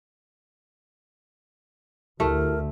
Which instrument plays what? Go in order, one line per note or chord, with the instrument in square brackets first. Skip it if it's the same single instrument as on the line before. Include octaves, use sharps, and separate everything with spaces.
[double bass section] D2 [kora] A3 [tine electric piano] E4 G4 A5 [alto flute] A#4